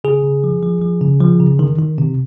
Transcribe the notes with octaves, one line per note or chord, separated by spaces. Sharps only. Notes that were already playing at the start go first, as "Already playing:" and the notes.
C#3 G#4
C#3
F3
F3
F3
C#3
F3
C#3
D#3
D#3
C3